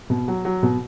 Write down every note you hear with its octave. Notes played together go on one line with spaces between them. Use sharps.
B2
F#3
F#3
B2